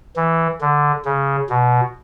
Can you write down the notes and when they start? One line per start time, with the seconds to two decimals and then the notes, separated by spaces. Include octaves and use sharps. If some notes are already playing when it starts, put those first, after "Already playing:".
0.16 E3
0.61 D3
1.05 C#3
1.50 B2